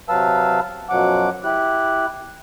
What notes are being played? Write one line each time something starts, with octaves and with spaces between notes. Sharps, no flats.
C3 F#3 B4 F5 A5 E6
F#2 B2 F3 F#3 F#5 D6
E4 G4 F#6